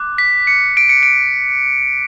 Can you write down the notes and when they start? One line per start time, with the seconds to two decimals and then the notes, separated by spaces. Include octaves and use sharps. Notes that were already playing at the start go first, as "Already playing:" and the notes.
Already playing: D6 F#6
0.18 B6
0.47 C#7
0.77 D7
0.89 C#7
1.03 D7